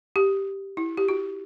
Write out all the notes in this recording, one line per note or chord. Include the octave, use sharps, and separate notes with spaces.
G4
E4
G4
F#4